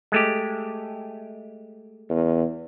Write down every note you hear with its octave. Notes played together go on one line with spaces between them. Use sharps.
G#3 A3 G4
E2